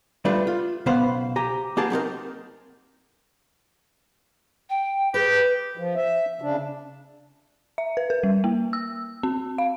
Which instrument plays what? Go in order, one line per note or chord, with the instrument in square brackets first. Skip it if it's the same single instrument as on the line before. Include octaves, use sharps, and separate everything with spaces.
[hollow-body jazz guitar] G3 A3 D4 F4 B4
F4
B1 C#3 B3 B4 C5 F5
G4 G#5 A#5
A#3 B3 G4 G#4 A5
F#3 C4 D#4 A#4
[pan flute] G5
[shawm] G4 [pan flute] G#4 [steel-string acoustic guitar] B4
[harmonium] F3
E5
C#3 D4
[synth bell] E5
B4
A#4
G3
A#3
E6
C4
F5